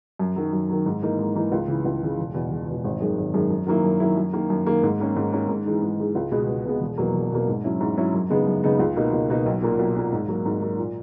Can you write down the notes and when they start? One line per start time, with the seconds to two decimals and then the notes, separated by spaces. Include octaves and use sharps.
0.19 F#2
0.36 D#3 F#3
0.53 F#2
0.69 D#3 F#3
0.86 G#2
1.02 E3 A#3 D#4
1.19 G#2
1.35 E3 A#3 D#4
1.52 C#2
1.68 C#3 E3
1.85 C#2
2.02 C#3 E3
2.19 E1
2.34 E2 B2
2.51 E1
2.68 E2 B2
2.84 G#1
3.00 F#2 D#3 G#3
3.17 G#1
3.34 F#2 D#3 G#3
3.50 F#2
3.67 D#3 F#3 A#3 E4
3.84 F#2
4.00 D#3 F#3 A#3 E4
4.17 F#2
4.33 D#3 A#3
4.50 F#2
4.66 D#3 A#3
4.83 G#2
5.00 D#3 A#3 C#4
5.16 G#2
5.32 D#3 A#3 C#4
5.49 G#2
5.66 E3 G#3 D#4
5.82 G#2
5.98 E3 G#3 D#4
6.15 C#2
6.32 B2 G#3 B3
6.49 C#2
6.65 B2 G#3 B3
6.81 E1
6.98 E2 B2 F#3 A#3
7.14 E1
7.31 E2 B2 F#3 A#3
7.48 G#2
7.64 F#3 C#4 E4
7.80 G#2
7.97 F#3 C#4 E4
8.14 F#2
8.30 C#3 G#3 B3 D#4
8.47 F#2
8.64 C#3 G#3 B3 D#4
8.79 C#2
8.96 B2 A#3 D#4
9.13 C#2
9.30 B2 A#3 D#4
9.46 B1
9.62 A#2 A#3
9.79 B1
9.96 A#2 A#3
10.12 G#2
10.28 F#3 A#3
10.45 G#2
10.62 F#3 A#3
10.78 A#2